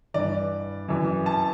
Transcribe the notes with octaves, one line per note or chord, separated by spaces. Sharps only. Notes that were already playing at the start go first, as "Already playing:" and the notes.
G2 E3 D5
F#2 E3
A5